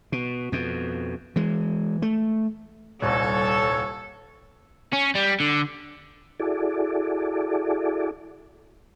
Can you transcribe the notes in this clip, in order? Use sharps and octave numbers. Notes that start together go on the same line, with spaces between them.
B2
F2 B2
E3 G#3
A3
D#1 C2 A4 C#5
C#4
G3
D3
E4 F#4 G#4 A4 D5